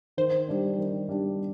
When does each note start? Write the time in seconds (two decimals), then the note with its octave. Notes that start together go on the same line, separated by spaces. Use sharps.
0.17 D#3 C5
0.48 G3 D4
0.78 D#3
1.09 G3 D4